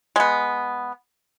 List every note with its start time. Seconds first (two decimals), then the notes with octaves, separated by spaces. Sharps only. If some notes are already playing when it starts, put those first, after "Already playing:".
0.16 G#3 B3